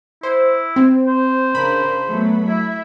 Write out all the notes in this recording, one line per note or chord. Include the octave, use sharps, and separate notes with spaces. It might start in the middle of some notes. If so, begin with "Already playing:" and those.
E4 C5
C4
C5
C#3 D4 A#4 B5
F#3 A3 B3
E4 E5